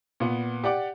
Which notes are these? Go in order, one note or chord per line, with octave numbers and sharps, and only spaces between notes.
A#2 B3 F#5
G4 D5 F#5 D6